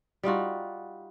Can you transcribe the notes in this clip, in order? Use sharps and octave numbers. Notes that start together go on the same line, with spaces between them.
G3 D#4 F4 F#4